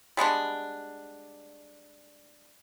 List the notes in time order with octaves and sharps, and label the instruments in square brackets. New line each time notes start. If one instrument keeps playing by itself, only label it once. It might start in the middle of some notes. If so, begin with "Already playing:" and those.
[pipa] G3 G#3 B3 D4